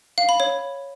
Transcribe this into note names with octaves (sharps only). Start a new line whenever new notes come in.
F5
B5
C#5